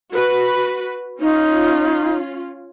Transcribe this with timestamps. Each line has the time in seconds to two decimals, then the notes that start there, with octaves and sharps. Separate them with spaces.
0.12 F#4 B4
1.21 C#4 D#4 F4